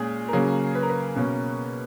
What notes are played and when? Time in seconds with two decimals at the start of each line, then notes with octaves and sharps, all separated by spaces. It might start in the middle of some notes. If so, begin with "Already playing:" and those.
Already playing: A#2 G#3 C#4 G#4
0.29 A#4
0.33 C#3 F#3 A#3 C#4 G#4
0.75 B4
0.83 A#4
0.89 B4
1.16 B2 A#3 C#4